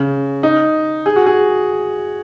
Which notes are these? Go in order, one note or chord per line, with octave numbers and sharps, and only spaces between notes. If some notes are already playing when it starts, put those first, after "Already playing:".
Already playing: C#3
D#4
G#4
F#4
G#4